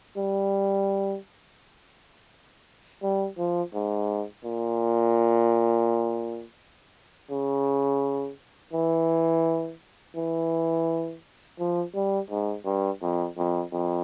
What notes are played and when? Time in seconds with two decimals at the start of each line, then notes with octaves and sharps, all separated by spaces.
0.17 G3
3.02 G3
3.37 F3
3.74 G#2
4.44 A#2
7.31 C#3
8.73 E3
10.16 E3
11.59 F3
11.94 G3
12.30 G#2
12.65 G2
13.02 F2
13.38 F2
13.73 F2